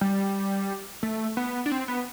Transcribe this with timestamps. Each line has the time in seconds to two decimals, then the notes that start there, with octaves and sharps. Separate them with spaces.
0.01 G3
1.03 A3
1.37 B3
1.66 D4
1.71 C4
1.88 B3